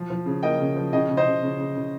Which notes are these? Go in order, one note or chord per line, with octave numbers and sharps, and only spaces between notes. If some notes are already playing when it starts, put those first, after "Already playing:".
Already playing: F3
F3
C#3
A#3 D#5 G5
C#3
F3
C#3 D#5 G5
C#3
C5 D#5
C#3
C#3
C#3
C#3